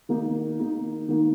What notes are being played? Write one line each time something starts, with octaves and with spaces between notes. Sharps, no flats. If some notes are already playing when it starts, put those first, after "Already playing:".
D#3 A#3 D#4
D#3 A#3 D#4
D#3 A#3 D#4